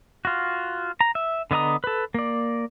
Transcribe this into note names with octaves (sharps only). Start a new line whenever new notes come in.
F4 F#4
A#5
E5
D3 B3 D#5 A#5 D#6
A4 B4
A#3 D5